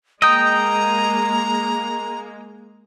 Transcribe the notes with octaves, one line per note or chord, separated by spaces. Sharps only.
G#3 A#3 D#5 G5 A#5 D#6